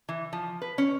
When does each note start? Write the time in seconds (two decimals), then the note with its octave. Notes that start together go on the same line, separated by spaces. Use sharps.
0.09 E3
0.33 F3
0.62 B4
0.78 C#4